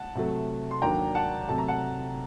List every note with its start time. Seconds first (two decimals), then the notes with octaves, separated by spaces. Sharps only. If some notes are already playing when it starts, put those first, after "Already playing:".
Already playing: F#5 A5
0.15 C3 F#3 A3
0.71 C6
0.82 D#2 D3 F#3 A#3 D4 G5 A#5
1.15 F#5 A5
1.48 C3 F#3 A3 A5
1.58 A#5
1.68 F#5 A5